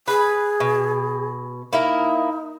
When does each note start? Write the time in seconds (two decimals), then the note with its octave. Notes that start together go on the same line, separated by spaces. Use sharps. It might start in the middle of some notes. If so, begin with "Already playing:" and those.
0.08 G#4 B4
0.60 B2
1.73 A#3 D#4 E4 A#4